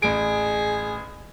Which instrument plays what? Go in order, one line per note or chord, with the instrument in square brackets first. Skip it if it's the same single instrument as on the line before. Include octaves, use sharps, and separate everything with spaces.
[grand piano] A1 D7 [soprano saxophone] G#4